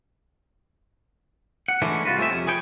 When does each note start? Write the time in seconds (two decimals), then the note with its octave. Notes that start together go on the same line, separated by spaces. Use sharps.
1.68 F#5
1.82 E3 G#3 A3 C#4 D4
2.05 C2 F4 F#4 B4
2.18 G#3 A3 C4 C#4 E5
2.31 F2 C3 C#4
2.47 G#4 B4 C#5 G5